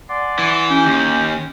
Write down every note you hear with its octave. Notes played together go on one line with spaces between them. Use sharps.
D5 F#5 G#5 C6
E3
C#4 G4
D#2